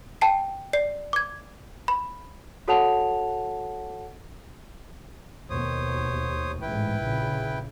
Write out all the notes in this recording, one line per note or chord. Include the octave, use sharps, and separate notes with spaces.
G5 A5 C7
D5 C7
D6 G#6
B5
F#4 A4 C#5 F#5 A5 F7
D#2 B2 C5 C#5 D#6
A1 G#2 G#3 E4 B4 G5
A#1 A#2 C#3